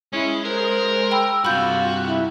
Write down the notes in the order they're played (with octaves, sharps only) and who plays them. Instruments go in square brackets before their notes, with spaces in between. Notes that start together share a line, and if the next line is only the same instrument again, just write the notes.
[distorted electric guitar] G#3 [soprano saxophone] C#4 [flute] E4
[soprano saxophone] A#4 [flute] C5
[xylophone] G5 B5 [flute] E6
[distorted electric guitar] G2 C3 [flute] F4 [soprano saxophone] F#4 [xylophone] B5 G6
[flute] E4